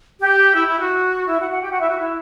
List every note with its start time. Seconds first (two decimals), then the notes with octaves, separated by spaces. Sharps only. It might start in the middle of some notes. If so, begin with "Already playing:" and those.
0.20 G4
0.55 E4
0.67 E4
0.79 F#4
1.27 E4 E5
1.39 F#4 F#5
1.50 F#4 F#5
1.62 G4 G5
1.71 F#4 F#5
1.80 E4 E5
1.89 F#4
1.99 E4